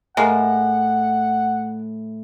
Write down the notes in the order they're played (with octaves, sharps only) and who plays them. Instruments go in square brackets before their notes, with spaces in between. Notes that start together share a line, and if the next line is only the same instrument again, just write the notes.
[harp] A2 [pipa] G#3 A#3 [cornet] F#5